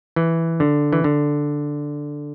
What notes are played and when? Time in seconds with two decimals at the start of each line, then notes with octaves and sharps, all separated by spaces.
0.16 E3
0.60 D3
0.93 E3
1.04 D3